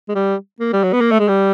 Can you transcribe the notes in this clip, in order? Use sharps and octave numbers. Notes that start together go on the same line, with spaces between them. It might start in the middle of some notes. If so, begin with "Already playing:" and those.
G#3
G3
A#3
G3
F#3
B3
A#3
A3
G#3
G3